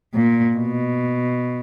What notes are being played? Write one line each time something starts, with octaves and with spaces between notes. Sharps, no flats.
A#2
B2